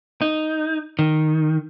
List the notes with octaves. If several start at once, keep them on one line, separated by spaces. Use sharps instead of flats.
D#4
D#3